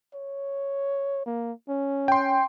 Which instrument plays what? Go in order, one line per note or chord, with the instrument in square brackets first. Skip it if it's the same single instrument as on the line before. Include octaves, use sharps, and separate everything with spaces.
[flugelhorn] C#5
A#3
C#4
[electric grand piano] G5 C6